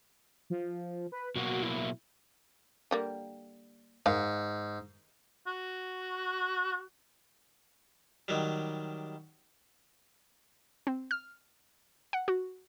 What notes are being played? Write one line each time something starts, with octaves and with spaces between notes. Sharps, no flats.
F3
B4
B2 F#3 A#3 F#4
E4
D3 G3 A#3
G#2 D#3 F5
F#4
D#3 F#3 G3
C4
F6
F#5
F#4